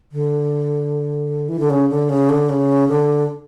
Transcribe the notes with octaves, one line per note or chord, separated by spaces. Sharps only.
D3
E3
D3
C#3
D3
C#3
D3
C#3
D3